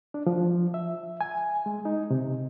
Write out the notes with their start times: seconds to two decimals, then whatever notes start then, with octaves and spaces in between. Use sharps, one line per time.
0.14 D4
0.27 F3
0.74 E5
1.21 G#5
1.66 G#3
1.85 D#4
2.11 C3